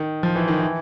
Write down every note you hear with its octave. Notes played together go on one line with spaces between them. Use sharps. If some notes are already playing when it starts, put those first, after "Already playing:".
Already playing: D#3
F3
E3
D#3
E3